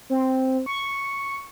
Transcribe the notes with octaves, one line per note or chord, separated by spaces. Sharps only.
C4
C#6